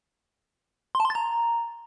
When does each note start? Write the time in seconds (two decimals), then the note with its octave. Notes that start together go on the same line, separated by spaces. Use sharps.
0.95 C6
1.00 A5
1.05 C6
1.10 A6
1.15 A#5